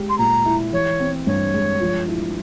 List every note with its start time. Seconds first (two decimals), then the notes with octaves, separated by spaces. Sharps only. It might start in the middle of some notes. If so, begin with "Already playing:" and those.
Already playing: G#3 G4
0.09 C6
0.18 A#2 A#5
0.46 E4
0.73 E3 C#5
1.00 C4
1.27 G2 C#5
1.54 G#3
1.81 F3
2.08 E4